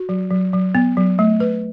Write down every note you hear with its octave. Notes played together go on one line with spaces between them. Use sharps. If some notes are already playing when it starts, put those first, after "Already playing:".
Already playing: F#4
F#3
F#3
F#3
B3
F#3
A3
B4